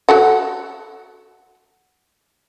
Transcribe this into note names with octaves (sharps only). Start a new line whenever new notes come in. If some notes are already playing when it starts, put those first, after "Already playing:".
F#4 A4 F#5